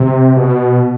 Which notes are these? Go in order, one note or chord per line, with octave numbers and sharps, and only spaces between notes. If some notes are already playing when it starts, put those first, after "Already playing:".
Already playing: C3
B2